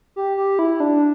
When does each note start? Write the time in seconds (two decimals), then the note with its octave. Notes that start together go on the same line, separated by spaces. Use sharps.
0.16 G4
0.37 G4
0.59 E4
0.80 D4